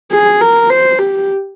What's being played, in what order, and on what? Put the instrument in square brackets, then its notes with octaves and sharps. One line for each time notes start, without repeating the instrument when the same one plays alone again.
[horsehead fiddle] G#4
A#4
C5
G4